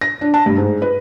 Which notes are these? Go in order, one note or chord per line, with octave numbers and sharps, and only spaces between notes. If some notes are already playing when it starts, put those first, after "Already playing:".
A#6
D4
A5
G2
G#2
B4